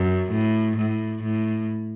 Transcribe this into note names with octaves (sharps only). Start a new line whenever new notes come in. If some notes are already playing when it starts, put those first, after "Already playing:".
Already playing: F#2
A2
A2
A2